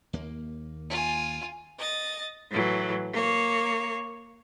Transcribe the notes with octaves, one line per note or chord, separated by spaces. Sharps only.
D#2 A#3
F4 G#5
D#5 A6
A2 E3 F#3
A#3 C#5